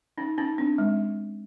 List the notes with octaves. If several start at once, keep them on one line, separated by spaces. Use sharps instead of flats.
C#4 D#4
C#4 D#4
C4 D4
G#3